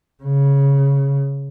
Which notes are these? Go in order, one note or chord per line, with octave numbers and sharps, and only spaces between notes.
C#3